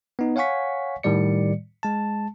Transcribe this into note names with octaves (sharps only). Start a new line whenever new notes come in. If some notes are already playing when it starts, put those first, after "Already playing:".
B3 D#4
C#5 F5 F#5 G#5 C#6 B6
A2 D#3 G3 D5 C#7
G#3 A5